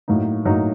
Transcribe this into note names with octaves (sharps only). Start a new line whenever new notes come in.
A2 F#3 A#3 D#4
A2 F#3 A#3 D#4